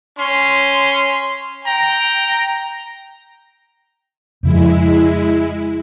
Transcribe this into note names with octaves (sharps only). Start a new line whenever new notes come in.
C#4 C6
G5 A#5
F2 C#3 F3 G#3 E4